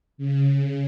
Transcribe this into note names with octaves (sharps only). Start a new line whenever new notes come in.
C#3